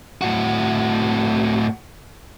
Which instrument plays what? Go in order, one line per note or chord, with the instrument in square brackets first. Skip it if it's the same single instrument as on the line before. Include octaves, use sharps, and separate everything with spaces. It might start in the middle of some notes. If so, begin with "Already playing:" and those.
[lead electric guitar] A2 F#4